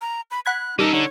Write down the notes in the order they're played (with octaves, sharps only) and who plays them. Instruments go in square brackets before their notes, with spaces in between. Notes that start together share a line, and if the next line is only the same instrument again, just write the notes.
[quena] A#5
B5
[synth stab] F#5 B5 G#6 [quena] F#6
[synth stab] G3 [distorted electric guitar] C#4 A4 [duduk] D#4 [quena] A#4
[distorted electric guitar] D3 [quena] C#5